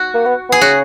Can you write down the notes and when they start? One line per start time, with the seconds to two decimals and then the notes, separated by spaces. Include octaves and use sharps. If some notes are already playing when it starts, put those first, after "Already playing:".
Already playing: F#4
0.14 A#3
0.26 B3
0.49 B3 G#4
0.61 C#3 F#4